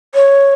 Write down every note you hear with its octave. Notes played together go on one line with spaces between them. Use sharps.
C#5